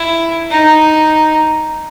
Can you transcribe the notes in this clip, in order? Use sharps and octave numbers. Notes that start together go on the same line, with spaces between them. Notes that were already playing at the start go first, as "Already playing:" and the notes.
Already playing: E4
D#4